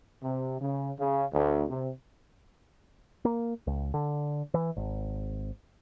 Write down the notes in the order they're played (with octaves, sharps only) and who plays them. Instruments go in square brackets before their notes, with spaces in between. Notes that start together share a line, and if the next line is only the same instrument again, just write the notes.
[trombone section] C3
C#3
C#3
D2
C3
[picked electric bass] A#3
C#2
D3
E3
G#1